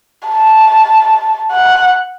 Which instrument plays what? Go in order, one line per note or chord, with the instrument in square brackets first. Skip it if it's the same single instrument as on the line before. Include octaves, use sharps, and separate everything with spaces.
[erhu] A5
F#5